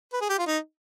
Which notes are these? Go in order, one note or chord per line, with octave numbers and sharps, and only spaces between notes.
B4
G#4
G4
F4
D#4